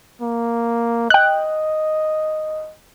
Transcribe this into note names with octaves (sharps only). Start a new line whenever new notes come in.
A#3
D#5 G5 F#6